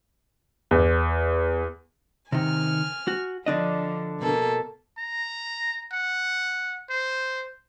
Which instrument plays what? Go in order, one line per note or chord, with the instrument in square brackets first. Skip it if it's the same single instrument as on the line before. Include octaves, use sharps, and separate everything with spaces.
[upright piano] E2
[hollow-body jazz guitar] C3 D#3 [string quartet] G#5 F6
[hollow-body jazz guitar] F#4
[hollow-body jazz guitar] D3 D4 D#5 [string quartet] F3
[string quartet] B2 A#3 A4
[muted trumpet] A#5
F#5
C5